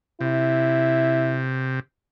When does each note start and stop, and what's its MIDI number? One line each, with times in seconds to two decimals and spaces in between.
0.21 1.80 48
0.21 1.43 64